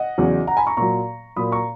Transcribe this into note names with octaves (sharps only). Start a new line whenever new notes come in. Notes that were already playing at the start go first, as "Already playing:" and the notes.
Already playing: D#5 F#5
E2 C#3 F#3
F#5 A#5
G#5 B5
A#5 C#6
A#2 F#3 A#5 C#6
A#2 F#3 B5 D#6
A#5 C#6